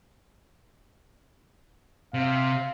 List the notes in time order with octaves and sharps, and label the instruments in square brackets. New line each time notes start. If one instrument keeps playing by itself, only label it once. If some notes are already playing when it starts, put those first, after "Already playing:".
[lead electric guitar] C3 [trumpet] F5